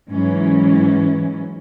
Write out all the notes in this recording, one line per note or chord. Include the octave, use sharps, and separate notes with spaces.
G#2 E3 F#3 C#4